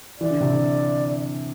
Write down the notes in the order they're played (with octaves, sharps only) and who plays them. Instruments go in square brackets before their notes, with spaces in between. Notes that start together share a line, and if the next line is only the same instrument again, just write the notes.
[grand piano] E3 [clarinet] D5
[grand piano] D3
C3
D3